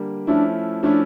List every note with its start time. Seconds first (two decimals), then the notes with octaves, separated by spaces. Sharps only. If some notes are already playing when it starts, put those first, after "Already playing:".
Already playing: D3 G3 A#3
0.27 F3 A3 C#4 D4 E4
0.83 F3 A3 C#4 D4 E4